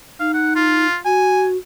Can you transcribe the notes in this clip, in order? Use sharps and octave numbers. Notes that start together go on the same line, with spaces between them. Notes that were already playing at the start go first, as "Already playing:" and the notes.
D#4 F5
F#5
F4
F#4 G#5